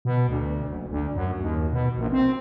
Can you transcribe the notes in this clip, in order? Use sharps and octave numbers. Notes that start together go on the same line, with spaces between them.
B2
D2
F#1
D2
F#2
D#2
B2
A#1
C4